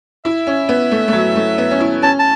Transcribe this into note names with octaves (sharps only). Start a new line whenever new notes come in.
E4 E5
C#4
B3
A3
A3
F#3
A3
B3
C#4
E4
C#4 A5
A5